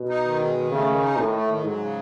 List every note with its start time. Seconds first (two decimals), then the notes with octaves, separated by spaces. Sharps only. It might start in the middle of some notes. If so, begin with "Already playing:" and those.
Already playing: B2
0.09 D#4
0.24 D#3
0.39 G#3
0.55 D#3
0.71 C#3 A3
0.87 D#3
1.02 D#4
1.17 A2 D#3
1.32 A3
1.48 D#3
1.63 G#2 F#3
1.79 C#3